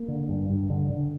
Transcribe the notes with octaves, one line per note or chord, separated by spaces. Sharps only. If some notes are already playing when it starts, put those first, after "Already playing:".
Already playing: A#3
D3
G2
G2
D3
D3